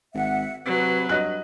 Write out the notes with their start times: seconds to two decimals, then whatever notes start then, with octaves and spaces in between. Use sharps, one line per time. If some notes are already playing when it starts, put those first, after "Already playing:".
0.14 G#1 E5 F#5
0.66 C3 F#3 B4
1.09 G2 D#5 F#6